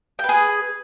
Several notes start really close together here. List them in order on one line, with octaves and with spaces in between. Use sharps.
G5 B4 G#4 G#5